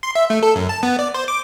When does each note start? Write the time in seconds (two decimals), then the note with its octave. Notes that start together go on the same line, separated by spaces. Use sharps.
0.03 C6
0.15 E5
0.30 A3
0.43 A4
0.56 F#2
0.69 A5
0.83 B3
0.99 D5
1.14 C5
1.28 D6